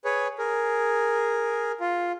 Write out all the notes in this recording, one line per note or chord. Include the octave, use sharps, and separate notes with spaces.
G#4 B4 C#5
G#4 A#4
F4